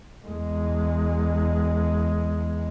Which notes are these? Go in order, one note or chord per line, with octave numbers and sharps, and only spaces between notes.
E2 G#3